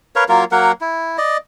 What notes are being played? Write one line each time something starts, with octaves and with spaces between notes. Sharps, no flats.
A#4 B4 C#5 F5
F#3 A#3 F4 A#4
F#3 A#3 A#4 F#5
E4
D5 D#5